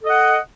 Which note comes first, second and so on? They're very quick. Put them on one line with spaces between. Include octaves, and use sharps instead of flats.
A4 D#5 F#5